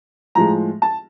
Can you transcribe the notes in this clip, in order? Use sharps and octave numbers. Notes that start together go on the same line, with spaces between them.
A2 F3 G#3 A#5
A5